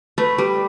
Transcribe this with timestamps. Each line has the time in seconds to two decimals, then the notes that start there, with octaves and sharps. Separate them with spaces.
0.18 A3 B4
0.38 G3 B4